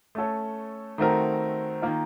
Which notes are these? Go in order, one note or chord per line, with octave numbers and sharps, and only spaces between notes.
A3 C#4 A4 C#5
D#3 A3 C4 F#4 A#4
D#3 A#3 F4